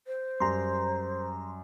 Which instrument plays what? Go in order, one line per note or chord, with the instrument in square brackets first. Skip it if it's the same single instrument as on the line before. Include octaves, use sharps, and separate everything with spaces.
[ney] C5
[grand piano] F#2 G3 [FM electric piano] A#5 C6